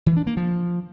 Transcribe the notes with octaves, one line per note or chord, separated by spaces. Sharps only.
E3
D4
A#3
F3